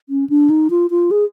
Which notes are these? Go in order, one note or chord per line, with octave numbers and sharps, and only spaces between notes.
C#4
D4
D#4
F4
F4
G#4